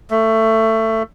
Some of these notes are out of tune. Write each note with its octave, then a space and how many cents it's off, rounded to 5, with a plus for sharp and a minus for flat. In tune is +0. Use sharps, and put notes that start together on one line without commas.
A3 +20